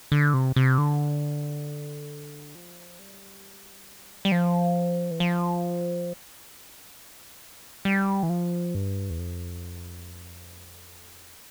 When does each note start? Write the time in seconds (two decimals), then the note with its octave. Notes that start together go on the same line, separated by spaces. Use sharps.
0.12 D3
0.34 C3
0.56 C3
0.78 D3
2.55 F3
2.99 G3
4.25 G3
4.32 F3
5.11 E3
5.20 F3
7.85 G3
8.23 E3
8.30 F3
8.75 G2
9.10 E2
9.19 F2